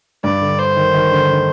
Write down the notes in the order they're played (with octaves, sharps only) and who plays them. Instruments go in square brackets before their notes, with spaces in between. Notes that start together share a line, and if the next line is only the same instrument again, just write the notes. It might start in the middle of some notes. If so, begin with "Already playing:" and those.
[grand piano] G2 [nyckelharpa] D5
[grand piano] D3
[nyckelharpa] C5
[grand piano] D#3
D#3
D3
D3